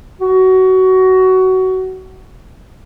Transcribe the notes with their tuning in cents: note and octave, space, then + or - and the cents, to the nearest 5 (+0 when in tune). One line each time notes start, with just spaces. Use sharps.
F#4 +20